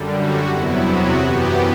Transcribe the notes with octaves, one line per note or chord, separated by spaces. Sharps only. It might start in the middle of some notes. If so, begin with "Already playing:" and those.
Already playing: F#2 D3 G3
F#4
E2 C3 F#3 B3 E4
F#4
F#2 E3 B3 G4